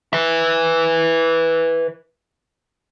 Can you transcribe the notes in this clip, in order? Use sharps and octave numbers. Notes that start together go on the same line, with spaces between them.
B4 E5